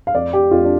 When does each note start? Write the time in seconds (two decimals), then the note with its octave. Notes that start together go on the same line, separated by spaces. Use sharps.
0.07 F5
0.15 F2 D5
0.33 G4
0.51 F2 F4
0.65 D4